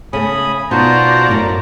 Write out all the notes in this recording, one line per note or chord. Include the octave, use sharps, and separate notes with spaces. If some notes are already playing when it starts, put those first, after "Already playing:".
C#3 A3 G#5 B5 D#6
B2 D#4 F4 F#4 C5 D5 A5 A#5
F#2 A2